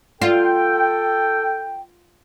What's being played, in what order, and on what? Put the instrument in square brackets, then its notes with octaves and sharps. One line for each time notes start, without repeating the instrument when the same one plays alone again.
[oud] F4 [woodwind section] A4 G5